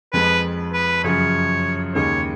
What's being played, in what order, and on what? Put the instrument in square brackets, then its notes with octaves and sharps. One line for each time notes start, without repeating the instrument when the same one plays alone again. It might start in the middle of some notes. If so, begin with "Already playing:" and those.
[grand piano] F2 F3 G#3 [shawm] B4
[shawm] B4
[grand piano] F#2 C#3 F3 [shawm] C#5
[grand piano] D#2 C#3 G#3 [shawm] C#5